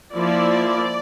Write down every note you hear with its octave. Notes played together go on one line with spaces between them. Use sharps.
F3 A#3 E4 D5